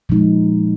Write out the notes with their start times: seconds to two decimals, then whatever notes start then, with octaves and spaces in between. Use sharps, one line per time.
0.09 A#2 F3 G#3 D#4